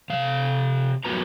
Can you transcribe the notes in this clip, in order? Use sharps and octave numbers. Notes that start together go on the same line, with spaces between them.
C3 F5
F#2 A#3 B3 F#4 B4 A#5